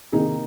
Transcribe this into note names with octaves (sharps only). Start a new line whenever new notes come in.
C3 D#3 A#3 D#4 G#4